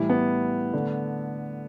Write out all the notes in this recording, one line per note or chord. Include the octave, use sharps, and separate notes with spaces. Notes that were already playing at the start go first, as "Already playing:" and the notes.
Already playing: A2 E3 G3 E4
B3
D3 A3